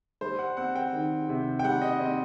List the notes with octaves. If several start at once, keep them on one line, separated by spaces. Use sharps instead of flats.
G3 C5
F#5
C4 F#5
G5
D#3
C3
G5
G3 F#5
D#5
C4 D#5